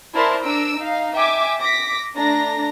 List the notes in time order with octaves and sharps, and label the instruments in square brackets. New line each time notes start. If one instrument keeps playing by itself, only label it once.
[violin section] E4 A#4 C5 D5 A5 C6
D4 A#5 E6 D7
D#4 F5
E5 G5 G#5 D6
D6 A#6 B6
A3 D4 A#5 A#6